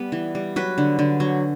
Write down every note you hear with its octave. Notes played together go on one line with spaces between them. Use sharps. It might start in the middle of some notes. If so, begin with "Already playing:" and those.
Already playing: G3 B3
E3
G3
F#3 B4
D3
D3
F#3